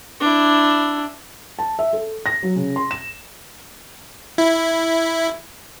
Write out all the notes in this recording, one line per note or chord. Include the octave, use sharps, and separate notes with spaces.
D4 E4
A5
E5
A4
A#6
F#3
C#3
C6
E7
E4